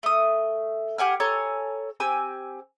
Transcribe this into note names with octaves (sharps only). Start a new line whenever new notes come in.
A3 D#6
G4 F#5 G#5 F6
A4 C#5 G#5 A#5
C4 G4 G#5 E6